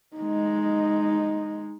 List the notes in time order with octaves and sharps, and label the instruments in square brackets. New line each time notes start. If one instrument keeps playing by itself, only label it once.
[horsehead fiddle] G#3 D#4